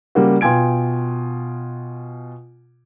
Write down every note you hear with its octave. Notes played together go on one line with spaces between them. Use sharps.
C#3 G3 A#3 F#4
B2 F4 G5 G#5 G#6 D7